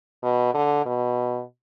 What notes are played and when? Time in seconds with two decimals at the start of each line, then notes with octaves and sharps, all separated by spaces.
0.23 B2
0.54 D3
0.86 B2